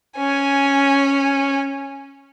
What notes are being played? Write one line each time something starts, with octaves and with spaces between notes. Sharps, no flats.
C#4 G#5